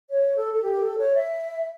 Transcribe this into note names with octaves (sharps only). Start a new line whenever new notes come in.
C#5
A4
A4
G4
A#4
A4
C#5
E5